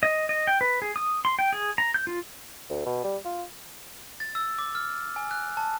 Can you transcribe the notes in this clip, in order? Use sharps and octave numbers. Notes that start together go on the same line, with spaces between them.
D#5
D#5
G5
B4
G#4
D#6
C6
G5
G#4
A#5
G6
F4
D2
B2
G3
F4
A6
E6
D6
F6
G#5
F#6
A5